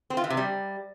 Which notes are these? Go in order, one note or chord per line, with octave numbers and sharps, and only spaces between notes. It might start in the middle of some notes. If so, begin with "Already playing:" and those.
C4
F4
E3
C3
G3